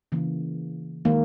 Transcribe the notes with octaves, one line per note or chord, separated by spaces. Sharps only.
C#3 E3 A#3
D#3 G#3 A#3